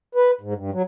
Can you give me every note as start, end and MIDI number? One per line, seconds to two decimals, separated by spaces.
0.15 0.31 71
0.41 0.54 44
0.55 0.70 43
0.73 0.82 54